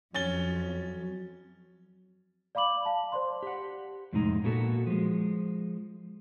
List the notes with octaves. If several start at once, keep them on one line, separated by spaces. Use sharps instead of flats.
F2 F#3 C#4 A6 G7
D5 F5 B5 D6 F#7
F5 A5
C5 D5 C6
G4 F#5
F2 A2 C3 G#3 D#4 A#5
A#2 A#3 B3 F#4 A4
F3 G#3